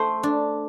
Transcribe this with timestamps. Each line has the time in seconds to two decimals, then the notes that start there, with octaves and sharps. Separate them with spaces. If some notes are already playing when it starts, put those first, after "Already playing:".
Already playing: A3 C5
0.23 D4